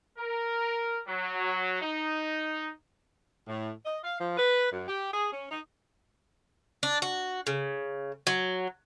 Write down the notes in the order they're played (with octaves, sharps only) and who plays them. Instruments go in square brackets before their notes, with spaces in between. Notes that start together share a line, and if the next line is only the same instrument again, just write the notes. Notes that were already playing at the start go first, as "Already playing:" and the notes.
[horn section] A#4
F#3
D#4
[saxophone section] A2
D#5
F5
F3
B4
F#2
G4
G#4
C#4
D#4
[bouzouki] D4
F#4
C#3
F#3